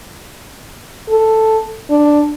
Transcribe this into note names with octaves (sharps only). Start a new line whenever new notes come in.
A4
D4